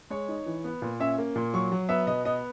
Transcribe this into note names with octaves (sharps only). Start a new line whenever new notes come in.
G#3 C#5
D#4
E3
B3
A#2
C#4 E5
A#3
A#2
F#3 C#6
F#3
B3 E5
B2 D#5
B3 D#5